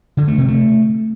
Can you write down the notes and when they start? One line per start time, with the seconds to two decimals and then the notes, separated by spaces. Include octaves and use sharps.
0.17 D3
0.28 A3
0.38 C3
0.48 A3